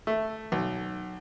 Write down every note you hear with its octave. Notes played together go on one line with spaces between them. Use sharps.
A3
B1